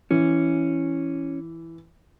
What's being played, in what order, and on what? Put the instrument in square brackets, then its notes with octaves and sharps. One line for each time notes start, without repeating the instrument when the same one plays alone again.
[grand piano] E3 [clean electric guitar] C#4